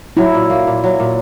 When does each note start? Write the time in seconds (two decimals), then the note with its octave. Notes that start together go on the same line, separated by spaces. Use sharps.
0.17 F#3 E4
0.34 A#2
0.50 A#3
0.67 A#2
0.84 F#3
1.00 A#2